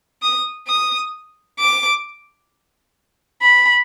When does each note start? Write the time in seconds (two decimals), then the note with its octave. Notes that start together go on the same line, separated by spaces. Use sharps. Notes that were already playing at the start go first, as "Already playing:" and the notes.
0.22 D#6
0.67 D#6
1.59 D6
3.42 B5